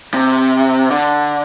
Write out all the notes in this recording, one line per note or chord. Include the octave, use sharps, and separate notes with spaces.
C3
D3